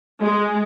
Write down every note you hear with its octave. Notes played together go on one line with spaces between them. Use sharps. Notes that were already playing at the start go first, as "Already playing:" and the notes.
G#3